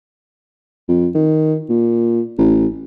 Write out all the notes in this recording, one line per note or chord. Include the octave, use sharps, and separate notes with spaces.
F2
D#3
A#2
A1